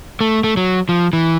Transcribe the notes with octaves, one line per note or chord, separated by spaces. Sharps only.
A3
A3
F#3
F3
E3